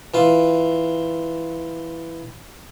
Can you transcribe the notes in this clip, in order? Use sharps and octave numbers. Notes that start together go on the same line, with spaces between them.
E3 F4